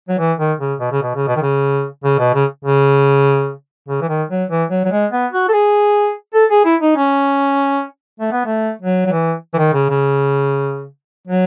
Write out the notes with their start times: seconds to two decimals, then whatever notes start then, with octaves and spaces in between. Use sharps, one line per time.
0.09 F#3
0.19 E3
0.39 D#3
0.60 C#3
0.80 B2
0.92 C#3
1.03 B2
1.16 C#3
1.27 B2
1.36 D#3
1.42 C#3
2.04 C#3
2.19 B2
2.34 C#3
2.65 C#3
3.89 C#3
4.02 E3
4.09 D#3
4.30 F#3
4.50 E3
4.71 F#3
4.85 F#3
4.92 G#3
5.12 B3
5.32 F#4
5.49 A4
5.53 G#4
6.34 A4
6.51 G#4
6.65 E4
6.82 D#4
6.97 C#4
8.20 A3
8.32 B3
8.46 A3
8.82 F#3
9.06 F#3
9.12 E3
9.54 E3
9.58 D#3
9.74 C#3
9.89 C#3
11.28 F#3